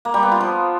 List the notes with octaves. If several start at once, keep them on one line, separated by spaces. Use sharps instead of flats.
A#3
G3
B3
F4
F3